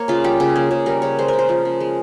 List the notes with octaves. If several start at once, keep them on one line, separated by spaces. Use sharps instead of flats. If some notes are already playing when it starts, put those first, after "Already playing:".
Already playing: A#3 C#5
C#3 F4
G3 G4
C#3
A#3 G#4
C#3 G#4
G3 A#4
C#3 C#5
G#3 C5
C#3 A#4
C5
F3
C#3
G#3